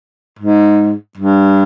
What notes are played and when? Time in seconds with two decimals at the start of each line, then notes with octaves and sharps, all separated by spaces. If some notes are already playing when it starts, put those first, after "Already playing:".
0.39 G#2
1.18 G2